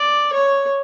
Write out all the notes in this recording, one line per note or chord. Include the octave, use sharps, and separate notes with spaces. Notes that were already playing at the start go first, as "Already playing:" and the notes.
Already playing: D5
C#5